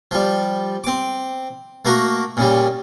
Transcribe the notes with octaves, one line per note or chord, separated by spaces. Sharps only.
F3 G3
C4 D6
A3 A#3 F#4 A#4
A#2 C#3 G3